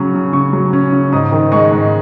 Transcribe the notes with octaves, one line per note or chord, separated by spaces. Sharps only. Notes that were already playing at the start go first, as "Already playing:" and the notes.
Already playing: C#3 F#3 C#4
C#3
C#3 C#6
F#3
C#4
C#3
G#2 D#6
D#3
G#3 C#6
G#2